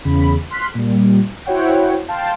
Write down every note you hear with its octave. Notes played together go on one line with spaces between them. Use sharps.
E2 C#3 B5
C6 F6 F#6 B6
A#2 G3
E4 F#4 C5 C#5 F#5 G5
F5 G5 A5 C6